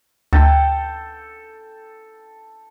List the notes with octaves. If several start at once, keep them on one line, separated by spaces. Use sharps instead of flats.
D2 A4 G5